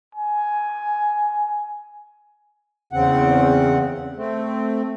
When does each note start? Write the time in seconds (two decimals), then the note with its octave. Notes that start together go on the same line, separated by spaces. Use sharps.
0.15 G#5
2.93 E2 C#3 C4 F#5
4.16 A3 C4